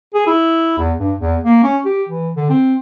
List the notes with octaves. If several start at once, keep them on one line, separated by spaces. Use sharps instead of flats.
G#4
E4
E2
G2
E2
A#3
C#4
G4
E3
D3
C4